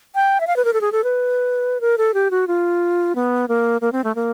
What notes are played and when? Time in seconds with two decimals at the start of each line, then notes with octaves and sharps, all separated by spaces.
0.15 G5
0.40 E5
0.47 F5
0.56 B4
0.65 A#4
0.73 A4
0.81 G#4
0.92 A4
1.04 B4
1.81 A#4
1.98 A4
2.14 G4
2.31 F#4
2.48 F4
3.15 B3
3.48 A#3
3.81 A#3
3.92 C4
4.04 A3
4.15 A#3